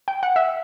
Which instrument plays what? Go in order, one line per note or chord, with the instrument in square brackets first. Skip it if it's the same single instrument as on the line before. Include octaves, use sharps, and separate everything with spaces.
[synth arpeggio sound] G5
F#5
E5